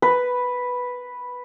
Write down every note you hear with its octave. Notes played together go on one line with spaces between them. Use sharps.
B4